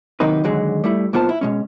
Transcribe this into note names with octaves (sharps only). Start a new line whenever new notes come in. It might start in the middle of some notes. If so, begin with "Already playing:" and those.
C3 D#3 F#3 A#3 D#4 B4
D#2 D3 F#3 G#3
G3 A3 E4
B1 A#3 B3 F4 C5 A5
E4
B2 G#3 C#4